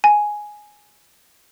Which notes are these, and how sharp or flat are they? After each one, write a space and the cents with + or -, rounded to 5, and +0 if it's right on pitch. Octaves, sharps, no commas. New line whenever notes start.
G#5 +5